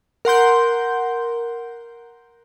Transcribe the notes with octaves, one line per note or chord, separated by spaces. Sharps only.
A#4 F#5 C6 G6